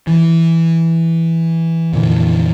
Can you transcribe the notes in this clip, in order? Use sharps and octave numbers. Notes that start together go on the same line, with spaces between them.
E3
F2 A#2 D3 E3